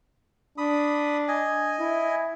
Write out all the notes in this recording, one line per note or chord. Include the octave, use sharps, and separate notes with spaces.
D4 B5 D#6
D#5 G#5
E4